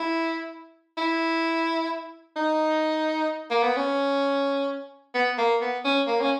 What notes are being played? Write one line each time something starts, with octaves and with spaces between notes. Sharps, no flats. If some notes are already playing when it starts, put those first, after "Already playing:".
Already playing: E4
E4
D#4
A#3
B3
C#4
B3
A#3
B3
C#4
A#3
C#4